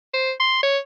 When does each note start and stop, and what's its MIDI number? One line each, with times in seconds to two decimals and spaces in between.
0.14 0.32 72
0.40 0.62 84
0.63 0.78 73